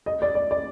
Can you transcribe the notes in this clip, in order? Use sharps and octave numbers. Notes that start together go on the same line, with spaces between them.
D#5
D5
D5
D5